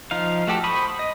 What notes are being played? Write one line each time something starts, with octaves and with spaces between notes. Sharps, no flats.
F3 D#4 F5
A3 F#4 G4 A4
C5 B5 C#6 D#6
D#5